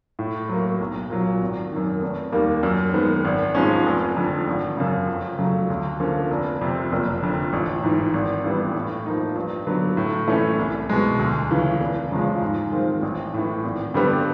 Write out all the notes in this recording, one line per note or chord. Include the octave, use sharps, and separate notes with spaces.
A2
F#3 A#3
B1
A#2 F#3
G#1
F#2 D#3
F1
D#2 D#3 G3 A#3
F#2
D#3 G#3 B3
G#1
G#2 F3 G#3 C#4
F1
F2 D3
G#1
F#2 C#3
F2
C#3 F#3 A3
D2
D3 F3 A#3 C#4
F1
F2 C3
F#1
F2 D3
A1
G#2 E3
G#1
G2 E3 G3 B3
A2
F3 A#3 D#4
G2
D3 F#3 B3
A2
E3 A3 C#4 E4
C2
B2 G#3
D2
C#3 E3
F1
E2 C#3 F3 G#3
G#2
D#3 G#3 C4 F4
A1
A2 E3
G#1
G2 D3 G3 B3